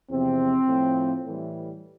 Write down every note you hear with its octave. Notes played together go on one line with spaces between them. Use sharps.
E2 C3 F3 C4
A2 F3
A2 E3 G3